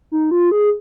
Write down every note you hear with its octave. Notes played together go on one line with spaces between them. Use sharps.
D#4
F4
G#4